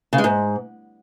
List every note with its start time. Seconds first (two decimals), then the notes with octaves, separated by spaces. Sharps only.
0.13 C#3
0.18 G#3
0.24 G#2